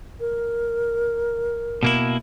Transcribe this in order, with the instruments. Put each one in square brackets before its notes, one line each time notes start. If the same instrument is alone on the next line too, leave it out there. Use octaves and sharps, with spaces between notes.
[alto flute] A#4
[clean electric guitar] B2 A#3 E4